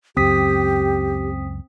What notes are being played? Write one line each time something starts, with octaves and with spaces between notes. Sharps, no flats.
C#2 F#2 C4 G4 D#6 B6